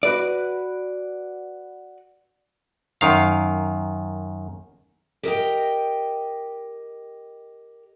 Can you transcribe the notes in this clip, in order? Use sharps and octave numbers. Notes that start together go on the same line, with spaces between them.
F#4 B4 D5
F#2 D#3 F5
G4 A#4 D#5 G5